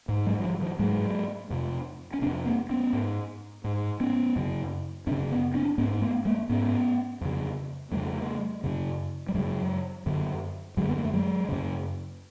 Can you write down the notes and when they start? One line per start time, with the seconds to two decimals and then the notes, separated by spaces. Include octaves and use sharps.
0.08 G#2
0.26 F#3 G#3
0.40 F#3
0.44 F3 G3
0.62 E3 F#3
0.79 G#2 F#3 G#3
1.50 F2 C3
2.14 C#4
2.21 C3 C4 D4
2.26 F2
2.45 A#3 C4
2.70 B3 C#4
2.93 G#2
3.64 G#2
4.00 B3 C#4
4.36 F#2 C#3
5.07 F#2 C4 D4
5.11 C#3
5.31 B3 C#4
5.54 C4 D4
5.78 G#2 B3 C#4
6.02 A3 B3
6.25 G#3 A#3
6.49 G#2 B3 C#4
7.21 F2 C#3
7.92 F2 C#3 G3 A3
8.64 F#2 C#3
9.29 G3
9.34 F#2 C#3 F#3 G#3
10.06 F#2 D3
10.77 F#2 D3 F#3 G#3
10.89 B3
10.97 A#3
11.04 A3
11.13 F#3 G#3
11.49 F#2 C#3